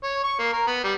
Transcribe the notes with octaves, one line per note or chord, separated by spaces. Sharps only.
C#5
C#6
A#3
A#4
B3
G3